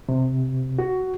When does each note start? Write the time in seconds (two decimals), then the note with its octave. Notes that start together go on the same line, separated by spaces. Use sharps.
0.09 C3
0.79 F#4